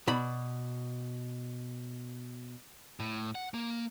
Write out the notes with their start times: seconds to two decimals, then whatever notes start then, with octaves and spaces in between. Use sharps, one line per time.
0.07 B2 D5 B5
3.00 A2
3.35 F#5
3.54 A#3